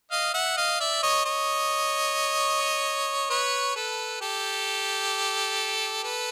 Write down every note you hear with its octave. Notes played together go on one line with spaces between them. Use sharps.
D#5 F5
E5 F#5
D#5 F5
D5 E5
C#5 D#5
C#5 D#5
B4 C#5
A4 B4
G4 A4
A4 B4